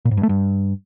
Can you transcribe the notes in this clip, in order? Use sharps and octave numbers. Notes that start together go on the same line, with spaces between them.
A#2
G#2
G2
A3
G2